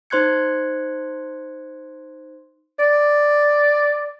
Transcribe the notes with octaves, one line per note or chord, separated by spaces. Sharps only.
D#4 C5 C6 F#6 G#6 C#7
D5